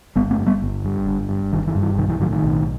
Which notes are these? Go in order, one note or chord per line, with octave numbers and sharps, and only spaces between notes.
G1 G3 B3
A3 C4
G2
G3 B3
G1
G2
G1
G2
G1 D#3
E3
G2
E3
B1 D#3
E3
A2 D#3 F#3
D#3
B1